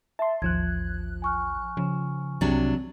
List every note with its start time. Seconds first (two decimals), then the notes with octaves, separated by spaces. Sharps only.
0.19 E5 A5 C6
0.42 A1 D#2 F3 F#6 G#6
1.22 G#5 C#6 F6
1.77 C#3 F3
2.41 C2 C3 F#3 D4